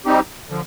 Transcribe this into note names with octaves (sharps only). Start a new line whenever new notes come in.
G3 C4 D#4 G4
D3 F3